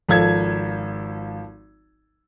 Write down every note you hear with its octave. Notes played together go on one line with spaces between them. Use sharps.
G#1 F3 A4 G#6